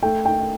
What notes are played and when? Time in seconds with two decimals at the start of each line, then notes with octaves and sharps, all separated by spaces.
0.02 A3 G5
0.25 G5